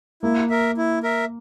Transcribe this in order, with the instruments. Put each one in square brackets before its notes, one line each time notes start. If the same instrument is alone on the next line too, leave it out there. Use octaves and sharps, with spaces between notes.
[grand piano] A#3 [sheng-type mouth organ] E4
[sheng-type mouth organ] A#4 E5
E4
A#4 E5